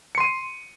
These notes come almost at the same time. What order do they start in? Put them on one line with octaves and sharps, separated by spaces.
C#7 C6 D#7